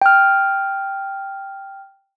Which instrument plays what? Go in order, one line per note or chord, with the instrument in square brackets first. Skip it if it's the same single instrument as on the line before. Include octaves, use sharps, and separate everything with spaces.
[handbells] G5 F6